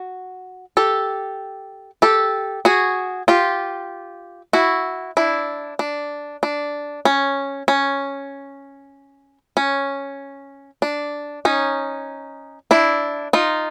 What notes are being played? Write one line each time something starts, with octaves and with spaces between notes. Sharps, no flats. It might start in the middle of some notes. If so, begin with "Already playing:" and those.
Already playing: F#4
G4 A4
G4 A4
F#4 G#4
F4 G4
E4 F#4
D4 E4
D4
D4
C#4
C#4
C#4
D4
C#4 D#4
D4 E4
D#4 F4